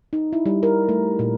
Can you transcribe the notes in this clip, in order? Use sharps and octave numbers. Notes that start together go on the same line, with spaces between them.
D#4
E4
G3
A#4
A3
A#2